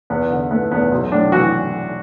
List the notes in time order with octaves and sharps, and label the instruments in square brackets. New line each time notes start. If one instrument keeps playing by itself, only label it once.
[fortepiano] E2 B3
D3
A3 B3
E2 B3
B1
A2 D4
E3 F#4